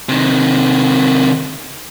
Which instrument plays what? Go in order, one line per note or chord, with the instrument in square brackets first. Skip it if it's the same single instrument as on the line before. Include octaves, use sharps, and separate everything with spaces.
[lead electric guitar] C3 D#3